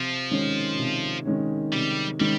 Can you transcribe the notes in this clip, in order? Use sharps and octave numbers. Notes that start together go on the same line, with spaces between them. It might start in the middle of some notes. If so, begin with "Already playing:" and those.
Already playing: C3 F3
D#3 G#3 C#4
C3
D#3 G#3 C#4
C3 G3
D#3 G3 G#3 C#4